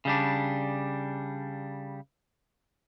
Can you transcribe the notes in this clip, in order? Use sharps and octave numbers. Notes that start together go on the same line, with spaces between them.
C#3 G3 D4